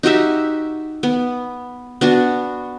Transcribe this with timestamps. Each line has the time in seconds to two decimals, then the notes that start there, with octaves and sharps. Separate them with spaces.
0.03 D#4 F#4 G4 E5
1.03 B3
2.01 B3 D4 F#4